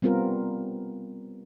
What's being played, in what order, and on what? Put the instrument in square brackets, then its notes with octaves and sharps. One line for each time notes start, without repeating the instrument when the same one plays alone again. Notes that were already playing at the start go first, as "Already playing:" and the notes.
[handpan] G3 B3 C4 F4 A#4